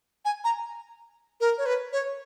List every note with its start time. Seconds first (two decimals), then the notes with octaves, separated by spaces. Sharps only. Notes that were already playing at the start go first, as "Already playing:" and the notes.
0.25 G#5
0.44 A#5
1.41 A#4
1.58 C#5
1.66 B4
1.92 C#5